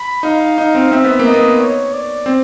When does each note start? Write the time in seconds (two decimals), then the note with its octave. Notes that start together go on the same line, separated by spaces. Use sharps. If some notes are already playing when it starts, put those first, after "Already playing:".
Already playing: B5
0.23 D#4 F5
0.58 D#4
0.75 C4
0.91 C4 E5
1.04 B3
1.19 A#3
1.25 D#5
1.33 B3
1.59 C#5
1.93 D5
2.26 C4